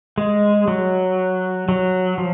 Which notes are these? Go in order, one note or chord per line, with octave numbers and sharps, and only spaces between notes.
G#3
F#3
F#3
F3